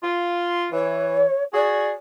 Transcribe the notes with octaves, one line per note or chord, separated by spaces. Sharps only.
F4
E3 C#5
F#4 G#4 D5